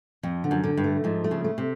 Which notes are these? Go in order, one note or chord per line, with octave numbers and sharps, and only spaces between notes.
F2 F3
D3
F#2
D3
G2
A3
G#2 F3
A3
C#3
A3
C3